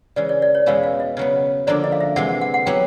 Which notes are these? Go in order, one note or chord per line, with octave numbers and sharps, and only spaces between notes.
C#3 E3 G#3 D5
D5
D5
C#5
E2 B2 G#3 C#4 E4 F5
F5
D#5
C#3 F#3 B3
D3 F3 A#3 D4 D5
D#5
F5
E5
C3 E3 G#3 F#5
F#5
F#5
F#5
F#3 B3 E4 G4 G5